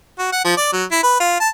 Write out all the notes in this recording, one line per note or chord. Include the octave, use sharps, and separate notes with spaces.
F#4
F#5
F3
D5
F#3
E4
B4
F4
A5